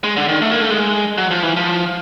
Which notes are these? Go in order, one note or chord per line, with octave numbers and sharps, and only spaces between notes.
G#3
D3
D#3
A3
A#3
A3
G#3
F#3
F3
E3
F3